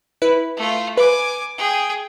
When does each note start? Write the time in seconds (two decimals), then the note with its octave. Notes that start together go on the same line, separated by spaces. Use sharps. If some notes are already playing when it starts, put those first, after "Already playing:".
0.22 E4 B4
0.57 A3 F4
0.97 B4 G#5 D6
1.58 G#4 G5